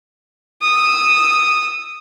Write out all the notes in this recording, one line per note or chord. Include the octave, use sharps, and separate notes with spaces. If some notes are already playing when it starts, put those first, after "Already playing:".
D#6 E6